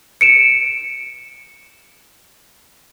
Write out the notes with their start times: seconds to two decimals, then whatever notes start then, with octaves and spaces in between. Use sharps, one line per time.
0.21 C#7 D7 E7